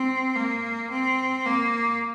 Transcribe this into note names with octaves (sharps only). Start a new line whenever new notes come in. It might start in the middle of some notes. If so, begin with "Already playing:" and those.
Already playing: C4
A#3
C4
A#3